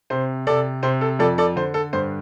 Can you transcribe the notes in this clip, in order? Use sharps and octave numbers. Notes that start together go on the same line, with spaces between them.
C3 C5
C3 A4 D5
C3 C5
A4
F2 A4 D5
A4 D5
D3 C5
A4
G2 C5